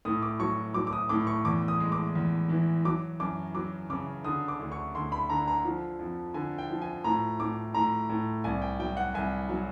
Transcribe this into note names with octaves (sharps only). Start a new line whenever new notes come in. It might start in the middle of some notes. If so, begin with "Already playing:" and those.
A2 D#6
D6
F#3 C#6
F#3 D6
D6
D#6
A2 D6
C#6
E2 D6
D#6
G#3
D6
E2
E3
F#3 D6
F#2 D6
F#3 D6
C#3 D6
D3 D#6
D6
D2
C#6
D2 C6
B5
D3 A#5
A#5
F3
F2
D3 G#5
G5
F3
G#5
A2 A#5
A2 D6
A2 A#5
A2
C2 G#5
G5
F#3 G5
F#5
C2 G#5
F#3